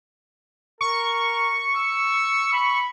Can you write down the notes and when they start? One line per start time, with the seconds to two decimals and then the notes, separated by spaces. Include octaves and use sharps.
0.81 A#4 C#6
1.77 E6
2.53 B5